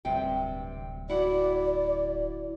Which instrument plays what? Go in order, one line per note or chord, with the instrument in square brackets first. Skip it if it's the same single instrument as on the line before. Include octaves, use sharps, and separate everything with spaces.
[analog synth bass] D1 [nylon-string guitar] G2 C3 G5
[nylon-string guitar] E4 F#4 F#5 [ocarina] D5